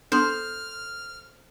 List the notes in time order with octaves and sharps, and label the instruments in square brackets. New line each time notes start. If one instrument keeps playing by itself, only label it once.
[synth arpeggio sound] B3 D4 [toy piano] A4 C6 D#6 [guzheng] C5 [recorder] F6